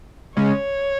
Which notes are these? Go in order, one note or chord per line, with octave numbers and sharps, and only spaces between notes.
C#3 G#3 C#4 C#5